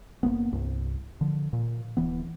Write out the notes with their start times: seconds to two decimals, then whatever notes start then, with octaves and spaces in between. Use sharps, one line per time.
0.23 F#1 E2 A#3 B3
0.52 C2 G2
1.21 D3 F3
1.53 A#2
1.97 D1 E3 B3